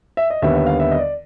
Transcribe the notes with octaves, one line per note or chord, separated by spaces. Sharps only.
E5
D#5
D#2 D3 G3 B3 E5
E5
F5
E5
D#5
D5